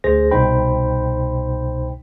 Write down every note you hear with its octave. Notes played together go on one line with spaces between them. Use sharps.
D2 G#4 C5 A#6
C2 B2 D#4 C5 G5 B5